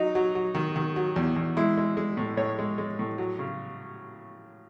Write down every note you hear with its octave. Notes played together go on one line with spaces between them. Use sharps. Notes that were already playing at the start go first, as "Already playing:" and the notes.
Already playing: F#3 D#4
F#3
F#3
D#3
D#3
F#3
E2
E2
G#3 E4
G#3
G#3
A2
A2 C#5
G#3
G#3
A2
F#3
C#3